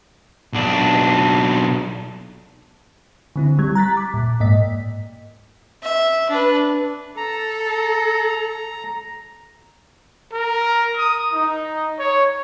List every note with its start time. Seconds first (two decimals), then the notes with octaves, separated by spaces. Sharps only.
0.53 B1 D4
3.36 D3 C4 E4
3.59 G3 G#6
3.75 A#5 F#6 A6 B6
3.97 D6
4.14 A#2
4.40 G#2 A#3 D#5 B6
5.83 E5
6.30 D4 B4
7.17 A4 A#5
10.33 A#4
10.97 D#6
11.33 D#4
11.99 C#5